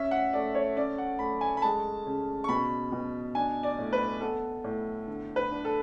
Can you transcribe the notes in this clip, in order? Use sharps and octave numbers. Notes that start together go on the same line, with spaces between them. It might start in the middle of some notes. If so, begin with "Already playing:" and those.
Already playing: C#4 E5
F#5
A3 D5
C#5
C#4 D5
F#5
A3 B5
G#5
B5
G#3 A5
C#3
C#6
B2 B5
B2
D4 G#5
D5
A2
B4
B3 A4
A2
D3
B4
D4
A4